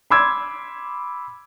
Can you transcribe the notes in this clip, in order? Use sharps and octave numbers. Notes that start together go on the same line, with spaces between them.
B5 C6 D6 E6 G#6